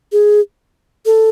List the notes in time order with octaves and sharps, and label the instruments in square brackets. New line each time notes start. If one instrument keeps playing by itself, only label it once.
[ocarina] G#4
A4